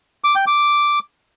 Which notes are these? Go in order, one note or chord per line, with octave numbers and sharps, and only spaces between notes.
D6
G5
D6